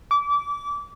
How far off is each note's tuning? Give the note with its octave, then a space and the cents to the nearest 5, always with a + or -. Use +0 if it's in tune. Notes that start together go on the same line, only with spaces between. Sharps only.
D6 -25